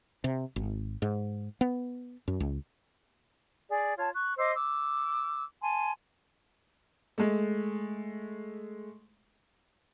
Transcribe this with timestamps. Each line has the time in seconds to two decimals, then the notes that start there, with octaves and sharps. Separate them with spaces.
0.24 C3
0.56 G#1
1.02 G#2
1.61 B3
2.28 F#2
2.40 C#2
3.69 G#4 D5
3.98 F4 C#5 A5
4.14 C#6 F#6
4.37 C5 D#5 D6 E6
4.54 D6 E6
5.61 G#5 A5 C6
7.18 G#3 A3